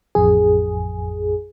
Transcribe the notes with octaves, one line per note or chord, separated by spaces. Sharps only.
A1 F2 G#4